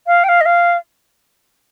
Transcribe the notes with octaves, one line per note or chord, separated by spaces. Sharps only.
F5
G5
F5
D#5
F5